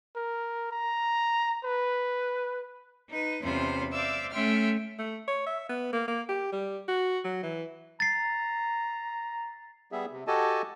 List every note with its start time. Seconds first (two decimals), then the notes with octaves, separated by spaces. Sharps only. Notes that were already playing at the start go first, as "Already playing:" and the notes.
0.16 A#4
0.71 A#5
1.65 B4
3.10 D#4 B4
3.42 E2 C3 C#4 F4 C5 B5
3.92 C5 D5 E5 F5 D6 E6
4.32 A3 C#4 E5 G5 C6 F6
4.99 A3
5.27 C#5
5.47 E5
5.69 B3
5.93 A#3
6.07 A#3
6.29 G4
6.52 G3
6.88 F#4
7.24 F#3
7.43 E3
8.00 A#5 A6 C7
9.92 G3 B3 G#4 E5
10.12 C3
10.27 F#4 G4 A4 D#5 G#5 A5